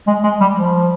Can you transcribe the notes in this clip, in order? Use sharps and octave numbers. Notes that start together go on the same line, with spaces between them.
G#3
G#3
G3
F3